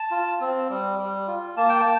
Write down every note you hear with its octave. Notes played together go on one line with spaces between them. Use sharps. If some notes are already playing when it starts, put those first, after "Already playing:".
Already playing: A5
F4
C4
G3
G3
F4
A#3 A5
G5
A5